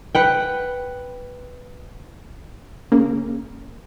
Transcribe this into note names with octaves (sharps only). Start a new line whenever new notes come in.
B4 F#5 G5
C#3 A#3